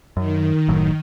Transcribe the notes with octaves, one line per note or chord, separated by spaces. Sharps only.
F#2 D#3
F#1 A2 F#3